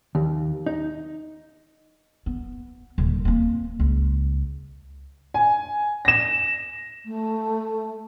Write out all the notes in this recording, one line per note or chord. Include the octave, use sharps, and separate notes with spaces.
D#2
D#4
B3
D#1 D3
A#3 C4
C#2
G#5
A#6 E7
A3